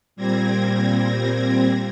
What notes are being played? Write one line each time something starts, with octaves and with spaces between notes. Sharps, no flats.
A#2 G3 C4 G#6 A#6